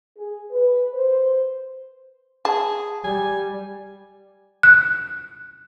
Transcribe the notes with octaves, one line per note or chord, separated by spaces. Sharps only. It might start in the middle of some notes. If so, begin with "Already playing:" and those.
G#4
B4
C5
G#4 A5
G3 G#5
F#6